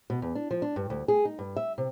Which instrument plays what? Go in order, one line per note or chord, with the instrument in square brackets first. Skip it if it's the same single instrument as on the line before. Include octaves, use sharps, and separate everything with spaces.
[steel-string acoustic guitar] B2
E2
D4
F3
D4
G2
D2
G#4
D#4
G2
E5
C3